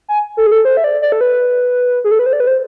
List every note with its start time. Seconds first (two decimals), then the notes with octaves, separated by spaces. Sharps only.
0.08 G#5
0.37 A4
0.46 G#4
0.52 A4
0.65 C5
0.77 E5
0.84 D5
1.02 D5
1.12 A4
1.21 B4
2.04 G#4
2.11 A4
2.19 B4
2.26 C5
2.33 D5
2.40 B4
2.47 C5